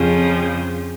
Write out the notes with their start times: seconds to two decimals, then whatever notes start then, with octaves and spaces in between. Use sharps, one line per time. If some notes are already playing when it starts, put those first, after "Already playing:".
Already playing: F2 C#3 F3